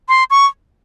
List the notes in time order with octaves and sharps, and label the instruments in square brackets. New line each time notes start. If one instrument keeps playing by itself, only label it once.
[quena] C6
C#6